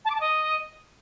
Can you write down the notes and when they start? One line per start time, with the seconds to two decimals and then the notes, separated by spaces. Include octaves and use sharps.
0.05 A5
0.10 D6
0.15 A5
0.20 D#5